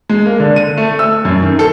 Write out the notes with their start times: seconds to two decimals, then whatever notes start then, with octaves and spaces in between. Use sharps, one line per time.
0.09 G#3
0.26 A#3
0.40 D3
0.56 D#7
0.78 A3
0.99 E6
1.25 F#2
1.42 D#3
1.59 A4